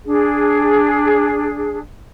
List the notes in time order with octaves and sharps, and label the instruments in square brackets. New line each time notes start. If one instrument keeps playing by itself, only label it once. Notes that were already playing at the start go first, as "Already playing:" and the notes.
[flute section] D4 G#4